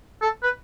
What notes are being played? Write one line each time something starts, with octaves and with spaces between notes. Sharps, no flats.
A4
B4